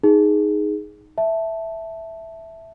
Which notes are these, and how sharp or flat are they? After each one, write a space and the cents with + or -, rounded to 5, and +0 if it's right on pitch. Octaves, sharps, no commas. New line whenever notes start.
D#4 +0 G#4 +0
E5 +0 A5 +0